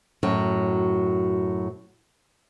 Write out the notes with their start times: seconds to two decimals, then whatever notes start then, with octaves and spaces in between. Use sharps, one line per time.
0.23 F#2 A2 F#3